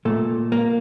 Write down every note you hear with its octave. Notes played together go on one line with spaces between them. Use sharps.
A#2 A3
A#3